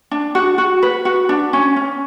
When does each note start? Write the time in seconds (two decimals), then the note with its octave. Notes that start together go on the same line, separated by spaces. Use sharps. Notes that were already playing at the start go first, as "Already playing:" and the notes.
0.11 D4
0.35 F#4
0.58 F#4
0.83 B4
1.05 F#4
1.29 D4
1.53 C#4
1.76 C#4